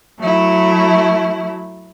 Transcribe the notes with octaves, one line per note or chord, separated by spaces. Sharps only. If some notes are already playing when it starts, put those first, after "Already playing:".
F#3 A3 E4